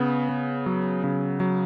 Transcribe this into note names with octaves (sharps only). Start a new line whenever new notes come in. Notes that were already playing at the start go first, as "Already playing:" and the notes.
Already playing: C#3 B3
B3
F#3
C#3
F#3